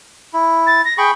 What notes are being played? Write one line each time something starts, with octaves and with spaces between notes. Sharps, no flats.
E4
A6
A#6
G#4 G5 B5 C#6